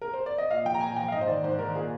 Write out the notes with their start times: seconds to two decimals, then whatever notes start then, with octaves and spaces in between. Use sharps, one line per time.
0.01 A#4
0.14 C5
0.26 D5
0.38 D#5
0.51 A#2 F5
0.65 F3 G5
0.74 A#5
0.81 A#2 G#5
0.96 F3 G5
1.08 F5
1.12 G#2 D#5
1.21 C5
1.27 D#3 D5
1.43 G#2 C5
1.59 D#3 A#4
1.75 A#2 G#4